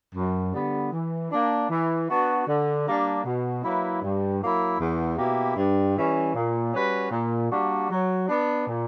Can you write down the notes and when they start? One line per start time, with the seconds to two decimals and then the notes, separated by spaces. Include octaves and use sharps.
0.15 F#2
0.53 D3 G3 B3
0.92 E3
1.30 A#3 D4
1.70 E3
2.08 B3 D4 F#4
2.47 D3
2.86 G3 A#3 D4
3.24 B2
3.63 F#3 A#3 E4 B4
4.02 G2
4.41 F#3 A#3 E4
4.80 E2
5.18 B2 A#3 E4 G4
5.57 G2
5.96 E3 G3 C#4
6.34 A#2
6.73 G3 C#4 F#4 B4
7.11 A#2
7.51 G3 A#3 D4 F#4
7.90 F#3
8.29 B3 D4
8.67 A#2